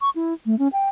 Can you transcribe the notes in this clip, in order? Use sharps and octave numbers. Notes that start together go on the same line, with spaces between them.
C#6
E4
A3
C#4
G5